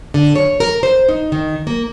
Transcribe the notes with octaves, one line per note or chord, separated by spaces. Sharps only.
D3
C#5
A#4
C5
D#4
D#3
A#3